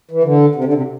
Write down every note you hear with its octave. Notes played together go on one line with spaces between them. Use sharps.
E3
D3
C3
D3
C3